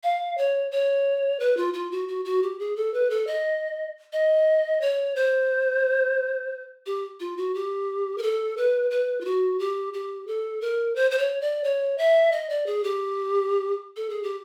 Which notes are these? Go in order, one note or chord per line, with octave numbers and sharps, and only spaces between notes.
F5
C#5
C#5
B4
F4
F4
F#4
F#4
F#4
G4
G#4
A4
B4
A4
D#5
D#5
C#5
C5
G4
F4
F#4
G4
A#4
A4
B4
B4
F4
F#4
G4
G4
A4
A#4
C5
C5
C#5
D5
C#5
E5
D#5
D5
G#4
G4
A4
G#4
G4